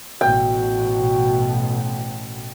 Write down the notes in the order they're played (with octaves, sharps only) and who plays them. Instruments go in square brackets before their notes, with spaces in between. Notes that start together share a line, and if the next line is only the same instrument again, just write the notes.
[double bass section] A1 B2 [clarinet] F#4 [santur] G5